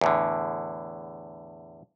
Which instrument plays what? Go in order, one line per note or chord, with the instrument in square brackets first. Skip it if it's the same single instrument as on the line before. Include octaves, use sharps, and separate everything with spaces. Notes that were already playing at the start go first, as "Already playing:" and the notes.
[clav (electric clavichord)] E2 A2 D3